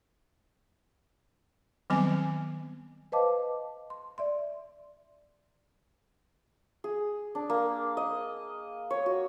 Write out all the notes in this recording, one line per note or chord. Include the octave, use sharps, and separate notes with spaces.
D#3 F#3 G3 B3 C4 G#5
B4 C5 D#5 F5 A5 D6
C6
D5 E5 C6
G#4
D4
A#3
D#5
C#5
F#4